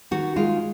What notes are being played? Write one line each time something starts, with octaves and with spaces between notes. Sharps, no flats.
D#3 F#4
G#3 F4